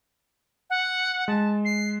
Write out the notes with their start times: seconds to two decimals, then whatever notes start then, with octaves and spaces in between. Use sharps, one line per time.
0.70 F#5
1.28 G#3 A5
1.65 C7